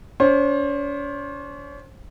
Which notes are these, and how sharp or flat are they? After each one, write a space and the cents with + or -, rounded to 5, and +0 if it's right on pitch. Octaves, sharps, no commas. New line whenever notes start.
C#4 +45 C5 +30